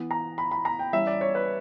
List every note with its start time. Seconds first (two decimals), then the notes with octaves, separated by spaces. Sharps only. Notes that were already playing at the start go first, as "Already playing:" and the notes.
Already playing: E3 B3
0.11 A#5
0.38 B5
0.51 B5
0.65 A#5
0.79 G5
0.93 E3 G3 C#4 E5
1.07 D5
1.21 C#5
1.35 B4